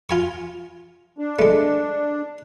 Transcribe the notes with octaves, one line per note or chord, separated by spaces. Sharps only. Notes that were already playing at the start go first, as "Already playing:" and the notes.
F4 G#5 C#6
D4
G#3 A3